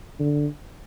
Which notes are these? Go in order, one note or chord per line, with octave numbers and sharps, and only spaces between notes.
D3